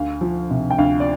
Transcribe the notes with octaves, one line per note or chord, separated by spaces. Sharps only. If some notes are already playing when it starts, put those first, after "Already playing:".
Already playing: D2 F5
F3
C3
G5
D2 F5
D5